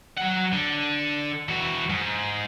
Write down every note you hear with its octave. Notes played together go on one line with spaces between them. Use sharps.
F#3 F#5
D3
E3 F#4
G#2